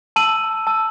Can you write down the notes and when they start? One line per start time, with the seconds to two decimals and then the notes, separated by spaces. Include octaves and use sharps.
0.16 A5 E6 D#7 F#7
0.67 A5 E6